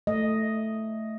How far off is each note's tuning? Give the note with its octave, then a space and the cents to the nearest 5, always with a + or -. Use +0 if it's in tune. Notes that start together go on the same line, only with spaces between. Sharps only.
A3 +0 D#5 +0